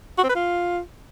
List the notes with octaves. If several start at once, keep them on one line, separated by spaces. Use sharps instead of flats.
F#4
C4
B4
F4